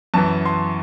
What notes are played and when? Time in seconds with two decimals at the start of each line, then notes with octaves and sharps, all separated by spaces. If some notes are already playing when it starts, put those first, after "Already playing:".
0.14 F#2 E3 A5
0.46 C6